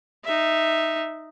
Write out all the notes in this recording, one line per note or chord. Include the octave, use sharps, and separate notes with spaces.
D#4 E5